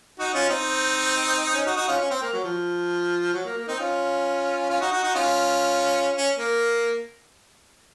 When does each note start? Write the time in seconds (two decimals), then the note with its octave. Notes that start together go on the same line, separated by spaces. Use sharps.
0.19 D#4 F#4
0.34 C#4 F4
0.49 C4 D#4
1.54 C#4
1.66 D#4 F#4
1.77 D#4 F#4
1.88 C#4 F4
2.00 C#4
2.10 C4
2.22 A#3
2.33 F#3
2.44 F3
3.34 F#3
3.45 A#3
3.58 A#3
3.68 C4 D#4
3.79 C#4 F4
4.70 C#4 F4
4.81 D#4 F#4
4.92 D#4 F#4
5.03 D#4 F#4
5.15 C#4 F4
6.16 C#4
6.38 A#3